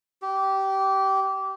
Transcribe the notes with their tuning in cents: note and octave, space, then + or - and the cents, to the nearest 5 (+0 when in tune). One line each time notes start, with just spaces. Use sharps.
G4 -20